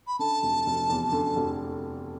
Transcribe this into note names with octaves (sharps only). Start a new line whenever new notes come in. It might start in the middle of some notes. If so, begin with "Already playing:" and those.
B5
D3 A5
F1
F1
E2
D3
F1